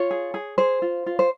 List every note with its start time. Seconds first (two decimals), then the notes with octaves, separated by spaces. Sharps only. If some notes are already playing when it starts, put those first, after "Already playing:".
Already playing: F4 C#5
0.11 G#4
0.34 G#4
0.58 G#4 C5
0.82 F4
1.06 F4
1.19 C5